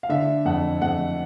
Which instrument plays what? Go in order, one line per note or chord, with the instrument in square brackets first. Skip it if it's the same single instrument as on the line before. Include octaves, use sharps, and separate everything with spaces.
[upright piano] F5
D3 E5
F2 F#5
F2 F#5